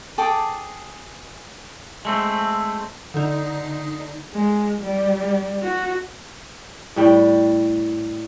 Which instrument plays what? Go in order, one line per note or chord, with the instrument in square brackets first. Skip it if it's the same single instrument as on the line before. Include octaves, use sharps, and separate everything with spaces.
[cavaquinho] G#4 A4 G5 D6
[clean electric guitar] G#3 A3 C4
[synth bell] D3 D#4
[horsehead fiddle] G#3
G3
F#4
[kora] A2 G3 G5